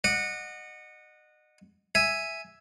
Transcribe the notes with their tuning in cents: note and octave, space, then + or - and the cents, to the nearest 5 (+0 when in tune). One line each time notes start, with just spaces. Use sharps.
D#5 -30 F#5 -10 D6 +0
E5 +0 G#5 +0